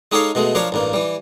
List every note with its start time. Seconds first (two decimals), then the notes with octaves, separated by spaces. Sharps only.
0.12 G#3 D#4 G4 A4 C#5 F5
0.35 B2 G#3 A3
0.55 F3 D4 F4 A#4 C#5
0.72 A1 G2 A#3
0.93 E3 G3